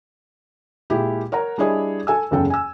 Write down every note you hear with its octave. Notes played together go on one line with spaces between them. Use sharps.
A#2 G#3 E4 G4
A#4 C#5 F#5 A#5
G3 D4 E4 G#4 C#5 D#5
A4 G#5 E6
F#1 E2 C#3 A4 G5
G#5 E6